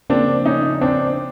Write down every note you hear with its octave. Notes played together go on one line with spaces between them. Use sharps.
C#3 F3 A#3 C4 D4
C#4 D#4
C4 D4